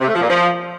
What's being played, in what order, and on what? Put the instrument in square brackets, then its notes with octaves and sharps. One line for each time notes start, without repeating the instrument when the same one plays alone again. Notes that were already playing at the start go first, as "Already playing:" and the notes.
[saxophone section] C3
A3
F3
A#2
F3